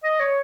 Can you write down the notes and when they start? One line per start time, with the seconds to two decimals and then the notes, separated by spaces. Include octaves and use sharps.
0.04 D#5
0.20 C#5